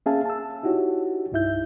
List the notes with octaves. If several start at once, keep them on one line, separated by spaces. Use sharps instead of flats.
A#3 C#4 G#4 E5 F5 A5
A5 E6
D#4 E4 F#4 G4 C#5
C2 G2 D#4 E4 E5 G6